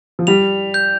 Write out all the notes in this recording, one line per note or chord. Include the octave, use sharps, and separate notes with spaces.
F3
G3 F7
G6